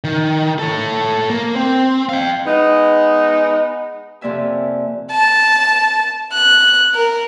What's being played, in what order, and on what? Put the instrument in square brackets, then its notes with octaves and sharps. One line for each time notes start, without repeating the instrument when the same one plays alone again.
[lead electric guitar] D#3
A4 C#5
A#3
C4
F5 G5
[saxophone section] G#3 B3 D#4
[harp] F2 C3 A#3 D5 E5 G#5
[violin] A5
F#6
A#4